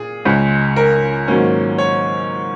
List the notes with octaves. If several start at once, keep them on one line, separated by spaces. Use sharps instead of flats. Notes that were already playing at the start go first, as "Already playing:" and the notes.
Already playing: A#2 G#4
C#2 C#3 G#3
A#4
G#2 D#3 F#3 A#3 C#4
C#5